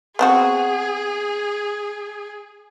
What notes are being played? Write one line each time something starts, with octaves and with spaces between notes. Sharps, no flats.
B3 C4 F#4 G#4